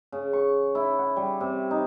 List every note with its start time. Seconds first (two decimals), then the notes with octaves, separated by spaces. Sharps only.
0.12 C#3
0.33 C#6
0.75 E4
0.99 F#5
1.16 G3
1.40 C3
1.71 D#4